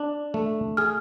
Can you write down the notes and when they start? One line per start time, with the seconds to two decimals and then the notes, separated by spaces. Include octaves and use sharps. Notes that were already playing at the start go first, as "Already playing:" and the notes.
Already playing: D4
0.34 A3
0.77 G#4 F6